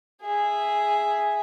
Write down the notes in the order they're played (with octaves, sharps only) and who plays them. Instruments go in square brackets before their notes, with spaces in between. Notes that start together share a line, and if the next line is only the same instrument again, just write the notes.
[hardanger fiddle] G#4 E5